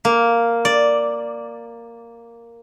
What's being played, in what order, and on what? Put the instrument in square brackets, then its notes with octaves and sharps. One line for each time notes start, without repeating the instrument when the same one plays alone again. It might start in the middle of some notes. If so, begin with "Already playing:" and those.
[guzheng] A#3
D5